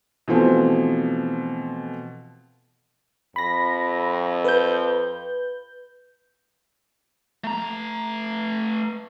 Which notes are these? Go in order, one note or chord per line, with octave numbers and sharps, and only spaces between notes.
B2 E3 F3 A3 C4
F2 B5 A#6
B4 G6
A3 A#5